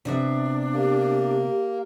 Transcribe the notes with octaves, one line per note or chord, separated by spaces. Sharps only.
C3 B3 D4 E5
A#3 G4